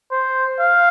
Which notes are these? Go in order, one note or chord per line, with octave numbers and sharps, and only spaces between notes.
C5
F5